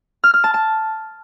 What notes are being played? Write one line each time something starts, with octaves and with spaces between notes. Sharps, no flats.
F6
F6
A5
A5